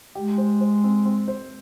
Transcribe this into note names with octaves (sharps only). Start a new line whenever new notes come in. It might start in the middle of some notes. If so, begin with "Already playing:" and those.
G#3 G4
C5
C5
C4
C4
C5